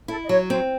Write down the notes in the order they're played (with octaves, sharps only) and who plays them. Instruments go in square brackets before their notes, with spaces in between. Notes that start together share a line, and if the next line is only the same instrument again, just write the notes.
[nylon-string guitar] E4 [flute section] A4
[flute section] D#5
[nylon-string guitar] F#3 [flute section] C#5
[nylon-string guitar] C4 [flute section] C5